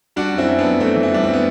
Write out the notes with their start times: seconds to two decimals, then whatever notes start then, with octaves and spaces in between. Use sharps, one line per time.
0.16 G3 D4 F#4
0.33 F#2
0.38 C4 E4
0.48 F#2
0.59 B3 D4
0.64 F#2
0.80 F#2 A3 C4
0.96 E3
1.03 E4
1.12 G3 D4
1.24 C4
1.33 B3